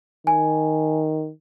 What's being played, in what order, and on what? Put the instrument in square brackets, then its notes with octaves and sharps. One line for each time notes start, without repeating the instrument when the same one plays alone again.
[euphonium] D#3 [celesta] G#5